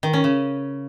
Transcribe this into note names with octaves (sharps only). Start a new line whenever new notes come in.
D#3
C#4
C#3